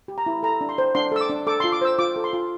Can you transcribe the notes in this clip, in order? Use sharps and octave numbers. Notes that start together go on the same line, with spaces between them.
G4
A#5
E4
A4 A#5
D4
C6
C5
D4 C6
A4 E6
D6
D4
A4 D6
F4 C6
D6
C5 E6
F4 D6
A4
C6
F4